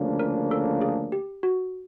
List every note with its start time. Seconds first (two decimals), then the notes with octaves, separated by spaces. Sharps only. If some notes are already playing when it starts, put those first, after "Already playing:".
Already playing: D2 C#3 F3 A#3 D4
0.20 A#4
0.51 A4
0.81 G#4
1.12 G4
1.43 F#4